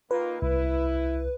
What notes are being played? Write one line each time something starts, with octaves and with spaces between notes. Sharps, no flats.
D#3 A#3 F4 B4
C2 E4